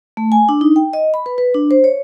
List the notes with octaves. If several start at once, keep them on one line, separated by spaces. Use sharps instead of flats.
A3
G#5
D4
D#4
G5
D#5
B5
B4
B4
D4
C5
C#5